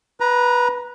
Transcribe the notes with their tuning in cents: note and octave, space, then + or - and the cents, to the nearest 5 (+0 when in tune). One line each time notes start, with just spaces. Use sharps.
B4 -10 A#5 +15